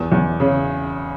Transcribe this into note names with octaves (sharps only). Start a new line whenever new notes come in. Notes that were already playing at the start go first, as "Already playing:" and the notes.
Already playing: E2
E2
C#3